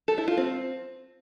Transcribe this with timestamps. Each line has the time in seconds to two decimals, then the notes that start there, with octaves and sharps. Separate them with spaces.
0.08 A4
0.18 E4
0.28 F4
0.37 C4